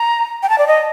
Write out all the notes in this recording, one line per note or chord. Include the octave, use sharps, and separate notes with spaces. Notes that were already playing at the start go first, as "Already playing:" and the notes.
Already playing: A#5
G5
A5
D5
D#5